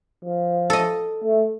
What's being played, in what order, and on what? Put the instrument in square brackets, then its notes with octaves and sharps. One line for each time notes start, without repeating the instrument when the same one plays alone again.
[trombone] F3
[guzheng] A4 D#5
[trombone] A3